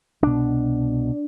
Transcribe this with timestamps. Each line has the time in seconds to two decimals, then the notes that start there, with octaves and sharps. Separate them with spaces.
0.22 C2 B2 D4